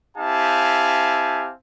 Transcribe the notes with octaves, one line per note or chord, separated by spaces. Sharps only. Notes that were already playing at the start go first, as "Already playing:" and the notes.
C4 E4 G4 F5 G#5 A5